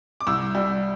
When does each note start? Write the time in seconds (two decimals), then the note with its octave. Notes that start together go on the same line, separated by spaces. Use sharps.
0.21 D6
0.27 C2 E6
0.55 G3